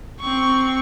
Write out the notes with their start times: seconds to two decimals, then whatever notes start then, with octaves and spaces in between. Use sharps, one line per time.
0.21 C4 C#6